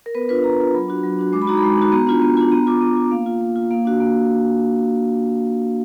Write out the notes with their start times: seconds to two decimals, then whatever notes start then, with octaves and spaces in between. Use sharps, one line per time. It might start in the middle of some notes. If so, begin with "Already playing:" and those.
0.06 A#4
0.15 B3 B4
0.29 D4 F4 B4
0.43 B3 A#5
0.58 D4 F4
0.74 F#3 B5
0.88 D4 F#4
1.04 F#3
1.19 D4 F#4
1.33 G#3 D6
1.42 B5
1.47 D#4 F#4 A#5
1.57 B5
1.63 G#3
1.78 D#4 F#4
1.92 B3 A#5
2.07 D4 F4
2.22 B3
2.37 D4 F4
2.51 B3 A#5
2.67 F4 D6
2.81 B3
2.97 F4
3.11 A#3 F5
3.26 F4
3.41 A#3
3.56 F4
3.71 A#3 F5
3.85 D4 F#4
4.00 A#3